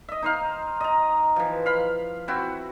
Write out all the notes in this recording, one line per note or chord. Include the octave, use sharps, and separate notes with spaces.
D#5 E5
D#4 C5 F5
D#5 A#5
E3 F3
F5 B5
C4 E4 F#4